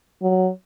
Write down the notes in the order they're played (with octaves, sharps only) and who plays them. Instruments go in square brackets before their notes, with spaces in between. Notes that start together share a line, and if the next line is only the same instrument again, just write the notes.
[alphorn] F#3